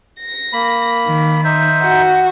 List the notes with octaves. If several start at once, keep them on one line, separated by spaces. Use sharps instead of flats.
A#6
A#3 B5
D#3
D#4 C5 E5
F#4